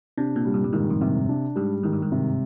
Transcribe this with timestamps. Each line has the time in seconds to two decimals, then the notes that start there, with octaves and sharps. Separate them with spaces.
0.17 C3 D4
0.36 A#2
0.45 G3
0.54 G2
0.64 G2
0.73 G#2 D#3
0.90 F2
1.01 G2 C3
1.29 D4
1.56 G#2 G3
1.83 G#2 D#3
1.93 G2
2.02 G#2
2.12 C3